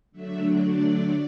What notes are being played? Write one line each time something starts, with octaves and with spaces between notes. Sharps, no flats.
D3 F#3 A3 D4 E5
D5